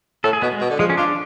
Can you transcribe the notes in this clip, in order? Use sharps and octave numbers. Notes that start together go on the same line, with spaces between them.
A2 A4
G#4
B2 B3
G#3
B2
D3
F3 G#3
C#4
D4 F4